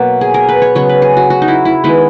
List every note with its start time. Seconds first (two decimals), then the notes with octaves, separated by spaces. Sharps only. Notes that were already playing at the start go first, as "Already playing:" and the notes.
Already playing: B2 F#3 A#3 F#4
0.21 G#4
0.34 A#4
0.49 B4
0.62 C#5
0.75 C#3 F#3 B3 C#5
0.89 B4
1.02 G#4
1.17 F#4
1.30 F#4
1.42 D#4
1.48 E4
1.65 E4
1.84 D#3 G#3 B3 E4